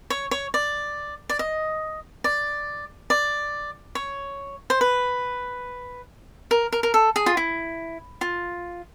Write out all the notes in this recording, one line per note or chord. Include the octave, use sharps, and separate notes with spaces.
C#5
C#5
D5
D5
D#5
D5
D5
C#5
C5
B4
A#4
A#4
A#4
A4
G#4
F4
E4
F4